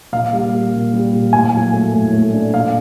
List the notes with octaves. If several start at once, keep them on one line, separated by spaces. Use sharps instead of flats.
A#2 F5
G3
A#3
A#2
G3
A#2
A2 G#5
F#3
A3
A2
A3
D4
A#2 F5